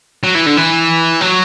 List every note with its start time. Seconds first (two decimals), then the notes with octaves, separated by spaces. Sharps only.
0.24 F#3
0.35 E3
0.46 D3
0.57 E3
1.21 F#3